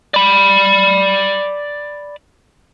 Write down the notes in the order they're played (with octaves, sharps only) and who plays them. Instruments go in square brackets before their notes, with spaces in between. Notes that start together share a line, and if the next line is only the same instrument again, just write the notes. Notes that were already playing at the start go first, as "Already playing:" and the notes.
[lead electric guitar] D5 B5